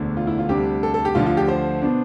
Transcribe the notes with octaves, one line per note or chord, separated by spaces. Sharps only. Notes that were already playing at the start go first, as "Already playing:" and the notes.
Already playing: E1 D2 D3 A3 D4
F4
E4
F4
D2 C3 G3 D4 G4
A4
A4
G4
D2 D3 F3 F4
F4
G4
C5
B2 B3 D4